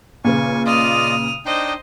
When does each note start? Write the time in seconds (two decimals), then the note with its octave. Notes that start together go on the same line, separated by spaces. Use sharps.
0.24 A#2 C#3 B4 G#5 C#6
0.66 F4 D5 D#5 D#6 F6
1.46 D4 D#4 C5 D#5 G5